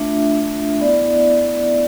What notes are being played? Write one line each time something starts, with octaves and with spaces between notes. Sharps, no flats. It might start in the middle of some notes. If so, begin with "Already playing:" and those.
Already playing: A3 D4 F4 E5
B3 E4 D5